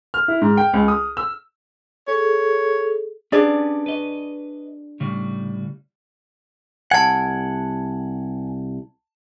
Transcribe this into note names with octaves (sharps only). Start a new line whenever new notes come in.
F6
E4
G#2
G5
C#2
D#6
E6
G#4 A4 C#5
C#4 D4 G4 G#4 B4 D5
B4 D#5
A2 C#3 G3
C2 F3 F#5 G#5 A5 G#6